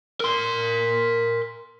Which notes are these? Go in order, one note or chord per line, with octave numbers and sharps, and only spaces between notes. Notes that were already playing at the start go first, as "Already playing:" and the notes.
A#4 C6